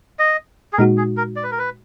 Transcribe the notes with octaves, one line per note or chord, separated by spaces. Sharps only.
D#5
G#4
A#2 G#3 D#4 F#4 A#4
G#4
A#4
D5
B4
A#4
B4